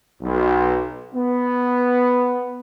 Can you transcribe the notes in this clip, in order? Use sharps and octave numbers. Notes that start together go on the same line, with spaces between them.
B1
B3